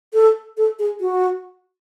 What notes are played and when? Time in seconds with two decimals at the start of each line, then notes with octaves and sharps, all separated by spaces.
0.14 A4
0.57 A4
0.79 G#4
1.01 F#4